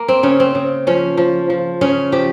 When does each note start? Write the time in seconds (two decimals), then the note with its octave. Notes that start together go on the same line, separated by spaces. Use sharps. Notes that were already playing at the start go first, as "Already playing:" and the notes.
Already playing: A#3
0.08 C4
0.23 C#3 C#4
0.40 C4
0.55 C#3
0.87 F3 C#4
1.17 F3
1.50 F3
1.81 C#3 C#4
2.12 F3 G4